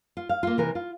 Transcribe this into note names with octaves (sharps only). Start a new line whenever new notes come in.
F4
F5
A#3 F4
C3 E3 A#4
F4